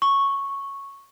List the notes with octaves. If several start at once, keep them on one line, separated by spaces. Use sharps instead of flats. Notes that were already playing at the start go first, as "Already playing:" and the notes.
C#6